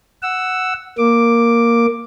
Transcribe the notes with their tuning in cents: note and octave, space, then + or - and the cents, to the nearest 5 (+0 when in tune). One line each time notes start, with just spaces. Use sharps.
F#5 +0 E6 +0
A#3 +0 D6 +0